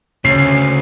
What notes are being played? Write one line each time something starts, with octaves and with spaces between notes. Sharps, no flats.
D2 C#3 C#4 C7